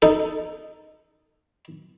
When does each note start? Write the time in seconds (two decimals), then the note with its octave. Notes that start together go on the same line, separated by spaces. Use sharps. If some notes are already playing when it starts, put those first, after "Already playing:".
0.02 D#4 A4